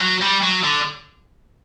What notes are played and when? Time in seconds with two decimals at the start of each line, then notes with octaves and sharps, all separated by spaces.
0.01 F#3
0.22 G3
0.43 F#3
0.64 D3